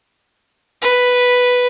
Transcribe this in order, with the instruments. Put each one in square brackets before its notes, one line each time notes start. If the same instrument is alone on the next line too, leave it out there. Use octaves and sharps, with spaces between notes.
[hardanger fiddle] B4